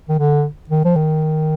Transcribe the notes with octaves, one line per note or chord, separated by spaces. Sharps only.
D#3
D3
D#3
F3
D#3